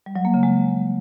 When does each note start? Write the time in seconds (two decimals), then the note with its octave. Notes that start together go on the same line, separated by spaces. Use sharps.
0.06 G3
0.16 F#3
0.25 A#3
0.34 C#3
0.43 G#3